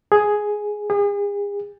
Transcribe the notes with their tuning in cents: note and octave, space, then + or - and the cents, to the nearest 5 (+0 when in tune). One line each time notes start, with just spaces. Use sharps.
G#4 +5
G#4 -40